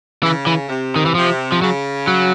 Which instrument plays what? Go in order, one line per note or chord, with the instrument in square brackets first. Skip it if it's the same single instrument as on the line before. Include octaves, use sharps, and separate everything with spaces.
[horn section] C#3 [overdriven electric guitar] E3
[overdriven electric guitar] E3
[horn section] C3
[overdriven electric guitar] D#3
E3
[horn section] C3 [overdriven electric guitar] F3
[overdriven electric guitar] F3
[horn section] C#3 [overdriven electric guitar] F#3
[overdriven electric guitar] F#3